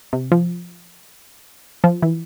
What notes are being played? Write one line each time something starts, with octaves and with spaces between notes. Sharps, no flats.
C3
F3
F3
E3